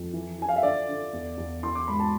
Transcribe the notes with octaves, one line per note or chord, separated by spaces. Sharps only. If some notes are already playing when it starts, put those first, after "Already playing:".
Already playing: F2
E3
E3 G#5
F5
E5
D3 D5
D3
E2
E2
E3 C6
D6
G#2 B5
A5